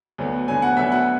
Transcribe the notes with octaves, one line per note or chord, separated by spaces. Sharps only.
D2 D3 F#3 B3
D2 D3 F#3 B3 G#5
F#5
D2 D3 F#3 B3 E5
F#5